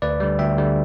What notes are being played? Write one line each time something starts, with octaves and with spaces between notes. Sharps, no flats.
D2 B4 D5
D3 G3
D2 E5 G5
D3 G3